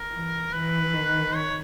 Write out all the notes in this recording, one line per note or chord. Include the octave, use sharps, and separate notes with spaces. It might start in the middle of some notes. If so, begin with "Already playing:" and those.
Already playing: A#4
E3
E3 B4
D#3
C#5